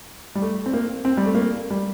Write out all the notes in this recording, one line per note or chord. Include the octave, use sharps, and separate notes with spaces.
G3
A3
C4
A#3
C4
G3
A3
A#3
G3